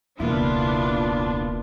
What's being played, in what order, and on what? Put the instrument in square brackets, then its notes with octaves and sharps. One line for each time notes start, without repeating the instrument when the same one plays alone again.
[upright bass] E1 C#2 [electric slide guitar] A#3 E4 [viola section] B3 D4 F4